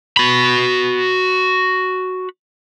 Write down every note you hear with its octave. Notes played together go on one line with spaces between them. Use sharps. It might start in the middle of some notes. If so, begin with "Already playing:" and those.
F#4 B5